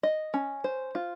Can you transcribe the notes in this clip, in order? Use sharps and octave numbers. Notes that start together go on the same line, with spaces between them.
D#5
C#4
C5
F4